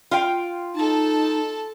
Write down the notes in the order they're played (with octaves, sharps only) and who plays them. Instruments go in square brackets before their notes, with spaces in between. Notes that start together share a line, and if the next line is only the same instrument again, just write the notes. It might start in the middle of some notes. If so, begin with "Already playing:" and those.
[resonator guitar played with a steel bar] F4 F5 G5
[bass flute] D#4 [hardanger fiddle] A4 A5